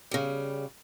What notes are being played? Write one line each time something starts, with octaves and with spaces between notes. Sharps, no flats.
C#3 G3